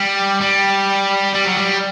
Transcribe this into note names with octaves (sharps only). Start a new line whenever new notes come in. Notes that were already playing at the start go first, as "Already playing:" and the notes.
Already playing: G3
G3
G3
F#3
G3